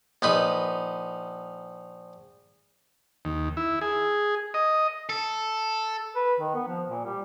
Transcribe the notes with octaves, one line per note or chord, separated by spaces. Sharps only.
A#1 D#4 B4
D#2
E4
G#4
D#5
A4
B4
D#3
B3
F3
A#2
G3